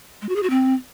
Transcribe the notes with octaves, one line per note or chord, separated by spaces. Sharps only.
G#3
F#4
G#4
F#4
C4